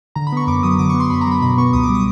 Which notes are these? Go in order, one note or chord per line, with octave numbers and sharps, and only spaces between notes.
D3 A#5
B5
B3 C#6
F#2 D6
F#3 D#6
D3 D6
C#6
B3
C6
F#2 B5
A#5
F#3 B5
B2 B5
B3 C#6
C#2 D#6
D6
G3
D#6